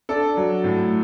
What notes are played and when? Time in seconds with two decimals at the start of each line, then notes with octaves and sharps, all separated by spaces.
0.09 D4 A4
0.37 F#3
0.64 A2